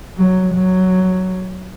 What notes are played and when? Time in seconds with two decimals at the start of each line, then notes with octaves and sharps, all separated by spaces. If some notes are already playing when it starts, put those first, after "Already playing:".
0.17 F#3
0.54 F#3